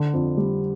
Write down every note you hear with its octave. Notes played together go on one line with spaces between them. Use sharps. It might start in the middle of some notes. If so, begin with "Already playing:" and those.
Already playing: D3
F2
G3